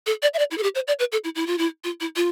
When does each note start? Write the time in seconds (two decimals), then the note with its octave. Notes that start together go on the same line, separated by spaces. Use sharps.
0.06 A4
0.22 D5
0.34 E5
0.39 D5
0.51 E4
0.58 A4
0.63 G4
0.75 C5
0.87 D5
0.99 B4
1.12 A4
1.24 E4
1.35 E4
1.47 F4
1.58 E4
1.84 F4
2.00 E4
2.16 F4